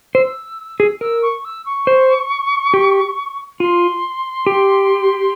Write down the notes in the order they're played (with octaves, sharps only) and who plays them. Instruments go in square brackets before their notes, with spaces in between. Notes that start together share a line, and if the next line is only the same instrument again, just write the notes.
[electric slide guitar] C5 [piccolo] E6
[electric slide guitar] G#4
[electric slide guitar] A#4 [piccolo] E6
[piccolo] C#6
E6
C#6
[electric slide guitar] C5
G4
[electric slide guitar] F4 [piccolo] C6
[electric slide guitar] G4